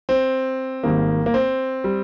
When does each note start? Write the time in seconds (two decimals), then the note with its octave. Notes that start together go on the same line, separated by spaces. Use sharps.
0.09 C4
0.83 G#1 G#2 D#3 G3 A#3
1.26 A#3
1.34 C4
1.84 G3